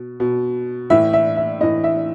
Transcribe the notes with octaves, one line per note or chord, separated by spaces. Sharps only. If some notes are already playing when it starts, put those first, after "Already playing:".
Already playing: B2
B2
A2 E3 E5
E5
E5
A2 E3 D#5
E5